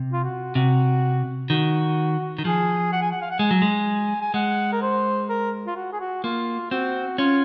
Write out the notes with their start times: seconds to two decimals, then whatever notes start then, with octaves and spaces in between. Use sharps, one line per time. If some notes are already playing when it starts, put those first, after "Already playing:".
Already playing: C3
0.12 F4
0.24 F#4
0.55 C3 F#4
1.50 D#3 F#4
2.38 D#3
2.45 F3 G#4
2.93 F#5
3.02 G#5
3.11 F#5
3.22 F5
3.30 F#5
3.39 G#3 G#5
3.51 F#3
3.62 G#3
4.22 G#5
4.34 G#3 F#5
4.72 A#4
4.82 C5
5.29 A#4
5.67 F4
5.76 F#4
5.92 G#4
6.00 F#4
6.24 A#3 F4
6.71 C4 F#4
7.18 C#4 F4